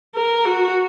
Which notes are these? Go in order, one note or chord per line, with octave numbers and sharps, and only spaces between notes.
A#4
F#4